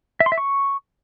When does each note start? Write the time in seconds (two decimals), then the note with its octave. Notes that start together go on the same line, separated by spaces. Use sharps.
0.20 E5
0.26 C6
0.32 E5
0.38 C#6